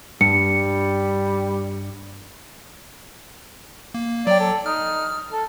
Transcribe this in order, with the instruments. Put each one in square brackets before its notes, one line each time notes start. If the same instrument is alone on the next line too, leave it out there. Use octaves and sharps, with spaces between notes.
[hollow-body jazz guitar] G2 [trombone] G3 [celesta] C#7
[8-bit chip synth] A#3
[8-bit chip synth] F#3 G5 [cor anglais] D5
[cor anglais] A4
[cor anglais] D#4 [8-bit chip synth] F6
[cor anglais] A4